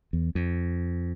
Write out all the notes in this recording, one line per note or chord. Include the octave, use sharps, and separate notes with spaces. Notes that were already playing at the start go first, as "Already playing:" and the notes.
E2
F2